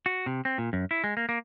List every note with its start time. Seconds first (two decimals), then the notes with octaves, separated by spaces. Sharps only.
0.06 F#4
0.26 C3
0.45 C4
0.58 A#2
0.73 F#2
0.91 E4
1.04 G#3
1.17 A#3
1.29 A#3